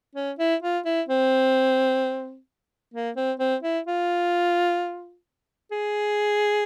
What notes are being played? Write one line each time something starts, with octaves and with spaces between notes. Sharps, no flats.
C#4
E4
F4
E4
C4
A#3
C4
C4
E4
F4
G#4